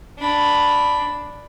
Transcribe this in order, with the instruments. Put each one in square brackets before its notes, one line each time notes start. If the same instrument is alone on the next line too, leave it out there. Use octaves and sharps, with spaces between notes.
[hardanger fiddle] D4 B5